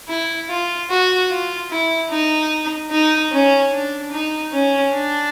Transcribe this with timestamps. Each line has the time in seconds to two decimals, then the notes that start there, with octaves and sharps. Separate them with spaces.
0.08 E4
0.49 F4
0.90 F#4
1.30 F4
1.70 E4
2.11 D#4
2.91 D#4
3.32 C#4
3.72 D4
4.12 D#4
4.52 C#4
4.93 D4